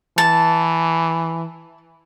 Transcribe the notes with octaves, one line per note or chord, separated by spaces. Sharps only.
E3 A5